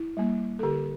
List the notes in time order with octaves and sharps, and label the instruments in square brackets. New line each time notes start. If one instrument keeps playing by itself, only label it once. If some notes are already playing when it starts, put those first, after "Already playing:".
Already playing: [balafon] E4
G3 A#3
A4
D3 G4